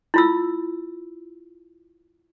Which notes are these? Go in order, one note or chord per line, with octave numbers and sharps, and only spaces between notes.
E4 F4 E6